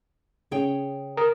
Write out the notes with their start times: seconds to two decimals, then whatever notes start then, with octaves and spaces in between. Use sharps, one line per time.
0.51 C#3 C#4 G#4 C#5 G5
1.17 A#4 A#5 D#6